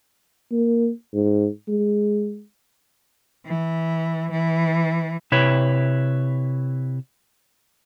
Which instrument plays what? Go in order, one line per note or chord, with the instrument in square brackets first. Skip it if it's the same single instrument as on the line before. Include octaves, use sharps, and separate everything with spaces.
[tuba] A#3
G#2
G#3
[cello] E3
E3
[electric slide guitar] C3 E4 B4 C#5